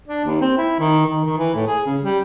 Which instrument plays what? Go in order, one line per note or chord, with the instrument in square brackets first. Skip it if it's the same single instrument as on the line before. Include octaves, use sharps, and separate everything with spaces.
[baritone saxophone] D4
D#2
C4
E4
D#3
D#3
D#3
E3
A2
G#4
C#3
G3